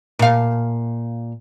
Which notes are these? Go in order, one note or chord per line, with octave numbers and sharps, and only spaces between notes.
A#2 F5